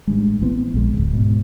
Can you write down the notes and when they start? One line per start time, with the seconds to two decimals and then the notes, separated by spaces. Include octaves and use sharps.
0.07 A1 G2 G#3
0.42 A1 E3 B3 C4
0.74 A#1 G#3
0.94 D1 C2
1.13 G#2 B2